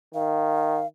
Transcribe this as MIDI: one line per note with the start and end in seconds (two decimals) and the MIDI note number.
0.15 0.83 51
0.15 0.87 77